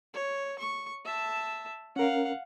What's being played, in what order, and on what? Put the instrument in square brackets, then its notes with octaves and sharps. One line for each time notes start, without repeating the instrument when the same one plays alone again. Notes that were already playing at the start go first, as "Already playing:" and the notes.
[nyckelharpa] C#5
C#6
E5 A5
[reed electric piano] C#4 A#4 [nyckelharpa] F5 F#5